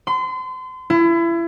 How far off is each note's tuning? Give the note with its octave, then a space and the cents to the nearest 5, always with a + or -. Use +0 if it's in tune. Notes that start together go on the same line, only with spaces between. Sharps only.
C6 -35
E4 +30